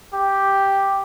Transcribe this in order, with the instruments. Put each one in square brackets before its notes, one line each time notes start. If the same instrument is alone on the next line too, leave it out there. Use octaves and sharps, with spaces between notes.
[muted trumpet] G4